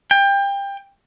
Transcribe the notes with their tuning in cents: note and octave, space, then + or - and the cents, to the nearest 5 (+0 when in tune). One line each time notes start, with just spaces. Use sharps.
G5 +25